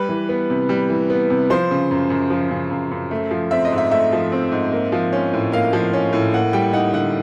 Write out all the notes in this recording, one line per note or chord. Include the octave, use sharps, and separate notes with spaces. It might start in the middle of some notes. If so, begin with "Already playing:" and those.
Already playing: G3 B4
E3
B3
C3
G3
E3
B3
C3
F3 C5
C#3
F#2
F#2
F3
C#3
F#2
F#2
A3
F3
C4 E5
D#5
G#2
E5
A3 E5
F3
C4
G#2
A#3
F3
C#4
A2
A#3 F5
F3
C#4
A2
A#3 F#5
G3 G5
D#4 F#5
D3 F#5